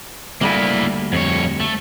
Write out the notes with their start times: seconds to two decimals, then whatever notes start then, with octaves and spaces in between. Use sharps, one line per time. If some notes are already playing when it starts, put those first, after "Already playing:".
0.41 D2 G3 A#3 E4 G#5
1.13 F2 C#5
1.60 A3